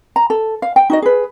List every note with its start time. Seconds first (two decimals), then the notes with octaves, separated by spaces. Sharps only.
0.16 A#5
0.30 A4
0.62 F5
0.76 G5
0.90 D#4 F#4 D#5
1.02 G#4 B4